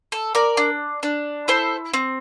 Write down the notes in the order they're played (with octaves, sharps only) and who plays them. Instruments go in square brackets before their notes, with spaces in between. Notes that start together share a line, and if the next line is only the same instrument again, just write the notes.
[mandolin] A4
A#4 D5
D4
D4
E4 A4 C5
C4